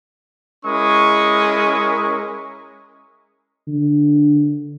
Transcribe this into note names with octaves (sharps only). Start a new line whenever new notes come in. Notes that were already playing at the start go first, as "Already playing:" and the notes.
G#3 C#4 E4 A#4 C#6 D#6
D3